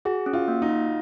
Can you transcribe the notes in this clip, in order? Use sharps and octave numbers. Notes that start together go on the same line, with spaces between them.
F#4 G#4
C#4
F4
A#3
D#4
F4